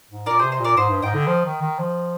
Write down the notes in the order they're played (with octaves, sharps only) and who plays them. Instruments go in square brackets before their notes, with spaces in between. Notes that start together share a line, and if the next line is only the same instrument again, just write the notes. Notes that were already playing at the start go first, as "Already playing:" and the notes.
[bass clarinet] G#2
[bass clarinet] A#2 [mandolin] A#4 D5
[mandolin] G#4 C5
[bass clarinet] C3
[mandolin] C5 D#5
[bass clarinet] A#2 [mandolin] A#4 D5
[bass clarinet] G#2 [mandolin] C5 D#5
[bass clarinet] G2
[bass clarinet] G#2 [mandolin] D#5 G5
[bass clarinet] D3
F3
D#3
D#3
F3